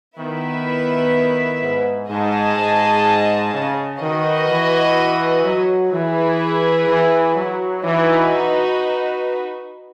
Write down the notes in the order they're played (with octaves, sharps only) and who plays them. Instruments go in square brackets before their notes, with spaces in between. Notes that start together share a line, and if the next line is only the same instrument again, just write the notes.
[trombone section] D#3 [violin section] B3 E4 B4 E5
[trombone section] G#2
[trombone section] G#2 [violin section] G#4 D#5 A5
[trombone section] G#2
C#3
[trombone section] D#3 [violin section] F#4 B4 D#5
[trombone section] E3
F#3
[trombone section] E3 [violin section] E4 G#4 B4
[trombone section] E3
F#3
[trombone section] E3 [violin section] D#4 F#4 B4